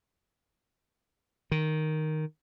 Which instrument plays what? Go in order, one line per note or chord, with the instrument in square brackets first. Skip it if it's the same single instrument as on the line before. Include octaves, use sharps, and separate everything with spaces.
[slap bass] D#3